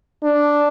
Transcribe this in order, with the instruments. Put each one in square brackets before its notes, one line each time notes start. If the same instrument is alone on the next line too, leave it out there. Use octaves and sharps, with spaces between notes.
[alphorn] D4